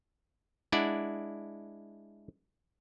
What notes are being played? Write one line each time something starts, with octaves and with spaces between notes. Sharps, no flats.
G#3 D4 E4 D5 F#5